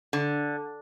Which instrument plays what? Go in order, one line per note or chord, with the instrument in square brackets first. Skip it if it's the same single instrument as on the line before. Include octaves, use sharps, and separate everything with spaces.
[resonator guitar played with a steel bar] D3